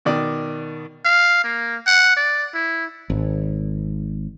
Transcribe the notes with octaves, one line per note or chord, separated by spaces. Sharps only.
B2 D#3 D5
F5
A#3
F#5
D5
E4
G#1